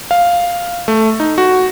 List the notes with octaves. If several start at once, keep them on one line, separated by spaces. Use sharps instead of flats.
F5
A3
D#4
F#4